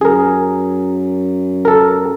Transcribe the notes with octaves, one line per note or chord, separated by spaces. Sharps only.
F#2 G#4 A#4
A4 A#4